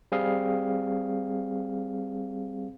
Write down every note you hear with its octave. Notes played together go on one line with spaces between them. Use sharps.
G3 C4 G#4 F5